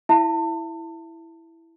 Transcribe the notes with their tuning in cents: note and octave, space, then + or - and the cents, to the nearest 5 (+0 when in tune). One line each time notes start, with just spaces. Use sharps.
E4 +0 E5 +30 A5 +30